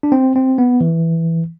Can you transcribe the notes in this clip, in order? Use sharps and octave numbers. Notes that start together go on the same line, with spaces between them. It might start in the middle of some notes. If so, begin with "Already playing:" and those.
D4
C4
C4
B3
E3